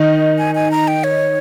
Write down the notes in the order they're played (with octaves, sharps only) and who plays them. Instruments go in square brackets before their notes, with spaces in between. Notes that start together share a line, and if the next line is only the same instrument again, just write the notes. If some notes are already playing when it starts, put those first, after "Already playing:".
Already playing: [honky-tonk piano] D#3 D#4
[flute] G#5
G#5
A#5
G5
C#5